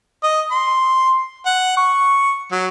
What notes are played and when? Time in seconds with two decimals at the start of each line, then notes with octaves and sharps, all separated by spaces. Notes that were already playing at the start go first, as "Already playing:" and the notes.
0.23 D#5
0.51 C6
1.46 F#5
1.77 C#6
2.51 F#3